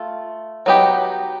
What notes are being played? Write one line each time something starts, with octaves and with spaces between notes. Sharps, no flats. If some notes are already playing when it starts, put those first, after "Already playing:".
Already playing: A3 F4
F#3 B3 D#4 G4